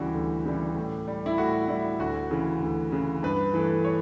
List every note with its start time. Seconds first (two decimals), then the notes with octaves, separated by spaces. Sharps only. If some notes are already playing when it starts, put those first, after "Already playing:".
Already playing: D2 C#3 E3 G3 F#4 G4
0.14 D2
0.45 C#3 E3 G3
0.76 A2
1.07 G3
1.26 E4
1.38 A2 F#4
1.68 G3 E4
1.99 D2 F#4
2.31 C#3 E3
2.61 D2
2.92 C#3 E3
3.23 G2 B4
3.54 E3 A3
3.85 C#5